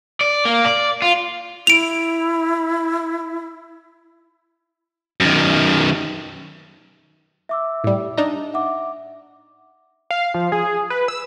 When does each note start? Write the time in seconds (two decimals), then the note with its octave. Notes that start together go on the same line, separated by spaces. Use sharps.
0.21 D5
0.45 A#3
0.65 D5
1.02 F4
1.67 E4 D7 F7
5.20 F#2 D#3
7.49 E5 D6 E6
7.84 A2 G3
8.17 D4 D#4 A#5
8.54 E5 F#5 D6
10.10 F5
10.34 F3
10.52 G#4
10.90 B4
11.08 E6